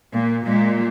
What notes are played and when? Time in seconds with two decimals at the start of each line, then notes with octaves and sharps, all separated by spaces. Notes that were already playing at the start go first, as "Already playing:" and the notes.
0.14 A#2
0.46 A#2 G#3